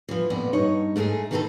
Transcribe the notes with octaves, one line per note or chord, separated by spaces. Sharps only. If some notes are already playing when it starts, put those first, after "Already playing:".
E3 F3
F2 A#2 B3 D5
G2 D#4 C#5
G#2 A3 D#4 G#4
D#3 E3 C4 C#4 D#4 A4